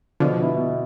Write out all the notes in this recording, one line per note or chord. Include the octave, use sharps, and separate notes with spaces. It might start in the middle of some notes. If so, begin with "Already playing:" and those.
B2 D3 F3
B3 E4
B2